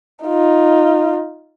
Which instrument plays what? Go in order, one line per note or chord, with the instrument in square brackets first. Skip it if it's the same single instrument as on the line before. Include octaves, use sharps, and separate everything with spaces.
[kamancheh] D#4 F4